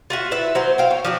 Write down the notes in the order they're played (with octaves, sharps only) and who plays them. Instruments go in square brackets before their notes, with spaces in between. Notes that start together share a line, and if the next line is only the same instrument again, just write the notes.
[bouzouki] F4 F#4 E5
E4 B4 E5
F#3 C5
F5 G5
C#5
F3 D4 F#4